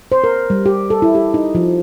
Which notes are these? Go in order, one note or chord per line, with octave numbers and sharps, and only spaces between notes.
C5
A#4
G3
G4
A4
E4
G4
D#4
F3